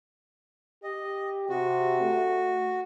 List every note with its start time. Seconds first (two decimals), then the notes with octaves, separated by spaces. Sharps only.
0.83 G4 D#5
1.49 C3 F#4
2.01 A3